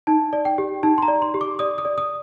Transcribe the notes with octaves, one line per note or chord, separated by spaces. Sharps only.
D#4 A5
D5
G5
G4
D#4 A5
C6
A#5
D5
C6
G4
D6
D5 D#6
D#6
D5
D#6